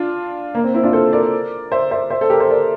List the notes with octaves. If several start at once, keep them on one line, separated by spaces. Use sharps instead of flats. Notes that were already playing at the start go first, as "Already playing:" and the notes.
Already playing: D4 F4
A#3
C4
C4 E4
D4 F4
A4 C5
A#4 D5
C5 E5
C5 E5
C5 E5
A4 C5
G4 A#4
A4 C5
A#4 D5